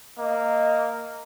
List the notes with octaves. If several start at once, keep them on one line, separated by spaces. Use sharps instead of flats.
A#3 D#5